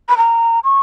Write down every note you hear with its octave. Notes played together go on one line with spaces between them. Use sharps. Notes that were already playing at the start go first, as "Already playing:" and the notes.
B5
A#5
C#6